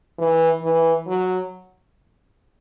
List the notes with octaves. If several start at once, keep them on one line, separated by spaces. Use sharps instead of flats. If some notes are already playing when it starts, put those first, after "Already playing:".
E3
E3
F#3